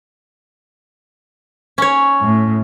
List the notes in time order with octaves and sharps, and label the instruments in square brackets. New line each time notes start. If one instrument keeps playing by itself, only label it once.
[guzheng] C#4 C#5
[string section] A2